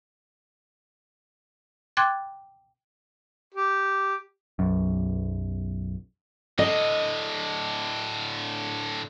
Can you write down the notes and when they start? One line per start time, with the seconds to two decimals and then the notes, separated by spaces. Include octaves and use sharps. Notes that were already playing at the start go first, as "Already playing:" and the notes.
1.97 G5 C6 D6 F#6 G#6 A6
3.54 G4
4.59 B1 F#2
6.59 A2 D3 D#5